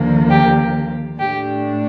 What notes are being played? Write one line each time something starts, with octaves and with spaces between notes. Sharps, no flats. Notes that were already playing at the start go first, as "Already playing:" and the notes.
Already playing: D#2 D3 F3 A#3
G4
A2 A3 D4 G4